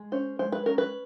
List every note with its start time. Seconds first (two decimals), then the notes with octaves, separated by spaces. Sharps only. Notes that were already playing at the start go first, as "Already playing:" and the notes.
Already playing: G#3
0.12 C#4 C5
0.39 G#3 C5
0.52 B4
0.66 C#4 A#4
0.78 B4